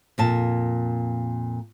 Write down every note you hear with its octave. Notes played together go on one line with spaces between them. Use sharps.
F2 A#2 A5